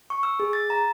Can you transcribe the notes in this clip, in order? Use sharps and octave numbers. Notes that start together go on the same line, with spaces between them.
C#6
E6
G#4
A6
A#5